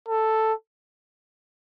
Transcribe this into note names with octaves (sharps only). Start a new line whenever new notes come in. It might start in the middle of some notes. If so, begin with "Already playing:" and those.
A4